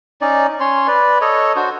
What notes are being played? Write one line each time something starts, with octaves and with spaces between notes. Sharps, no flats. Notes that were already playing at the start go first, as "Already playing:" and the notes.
C#4 D#4 D5
C#4 C#5 C6
B4 D5
A4 C#5 D#5
D4 F#4 C5